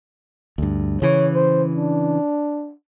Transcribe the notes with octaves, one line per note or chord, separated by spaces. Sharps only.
D2 G2
C#3 E3 C#5
C5
D4